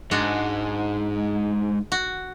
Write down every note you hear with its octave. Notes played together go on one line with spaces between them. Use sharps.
G#2 G#3 D4 F#4
F#4